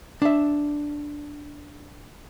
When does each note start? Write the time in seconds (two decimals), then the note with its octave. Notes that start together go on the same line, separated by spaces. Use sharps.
0.22 D4 E5